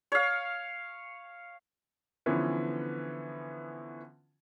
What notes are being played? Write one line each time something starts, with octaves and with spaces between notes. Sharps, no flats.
C#5 F5
D3 E3 F3 B3 C#4